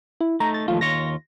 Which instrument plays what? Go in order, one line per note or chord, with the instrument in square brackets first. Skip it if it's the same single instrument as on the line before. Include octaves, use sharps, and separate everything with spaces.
[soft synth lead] E4
[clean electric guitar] A3 D#4 [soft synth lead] A#5
[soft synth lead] A6
[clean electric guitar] D#2 F3 A3 [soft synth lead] F4
[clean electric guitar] D#2 F4 C#5 [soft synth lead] A#6